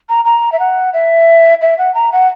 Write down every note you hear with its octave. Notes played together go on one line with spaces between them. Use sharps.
A#5
A#5
E5
F#5
E5
E5
F#5
A#5
F#5